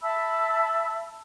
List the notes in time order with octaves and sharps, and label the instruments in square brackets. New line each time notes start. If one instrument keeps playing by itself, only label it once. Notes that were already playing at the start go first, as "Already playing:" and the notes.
[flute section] E5 A5 B5 E6